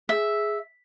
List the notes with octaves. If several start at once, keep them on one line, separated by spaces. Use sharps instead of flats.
G#4 E5